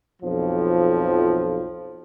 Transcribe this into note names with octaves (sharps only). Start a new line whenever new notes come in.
B1 F2 F3